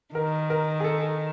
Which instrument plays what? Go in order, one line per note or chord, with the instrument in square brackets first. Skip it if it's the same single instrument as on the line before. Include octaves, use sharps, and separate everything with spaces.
[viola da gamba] D#3 [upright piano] A#4
[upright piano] A#4
G#4
A4